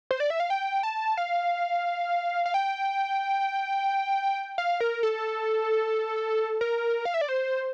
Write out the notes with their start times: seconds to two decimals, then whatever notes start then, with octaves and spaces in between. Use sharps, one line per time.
0.11 C5
0.20 D5
0.30 E5
0.40 F5
0.50 G5
0.83 A5
1.17 F5
2.46 F5
2.54 G5
4.58 F5
4.80 A#4
5.03 A4
6.61 A#4
7.05 F5
7.14 E5
7.21 D5
7.29 C5